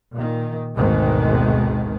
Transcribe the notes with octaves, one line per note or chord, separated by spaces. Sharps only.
A#2 D#3
G#1 D2 G#2 B2 D#3 G#3